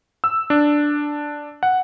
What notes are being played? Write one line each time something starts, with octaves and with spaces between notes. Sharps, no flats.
E6
D4
F#5